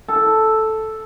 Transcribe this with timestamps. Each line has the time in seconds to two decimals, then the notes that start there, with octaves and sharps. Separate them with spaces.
0.08 A4